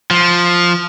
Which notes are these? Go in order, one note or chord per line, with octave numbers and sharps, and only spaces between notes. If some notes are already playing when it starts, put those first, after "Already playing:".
F3